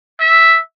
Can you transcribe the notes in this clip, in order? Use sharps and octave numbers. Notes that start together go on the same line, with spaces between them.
E5